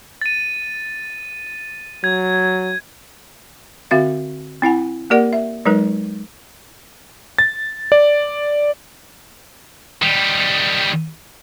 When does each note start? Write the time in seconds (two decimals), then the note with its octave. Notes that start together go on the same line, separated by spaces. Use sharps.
0.21 A6 D#7
2.04 F#3 G#6
3.91 D3 C4 F#4 E5 F5
4.62 C4 E4 F#5 G#5
5.10 A#3 G4 A#4 D5 F#5
5.33 E5
5.65 F#3 G#3 D#4 A#4 B4
7.38 A6
7.92 D5
10.02 D#3 G3